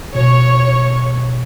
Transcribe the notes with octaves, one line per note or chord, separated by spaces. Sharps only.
B2 C#5